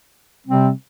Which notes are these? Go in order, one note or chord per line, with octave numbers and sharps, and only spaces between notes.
C3 G3 C4